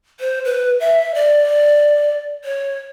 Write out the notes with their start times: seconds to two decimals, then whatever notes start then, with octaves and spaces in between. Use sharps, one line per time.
0.20 C5
0.45 B4
0.80 E5
1.15 D5
2.44 C#5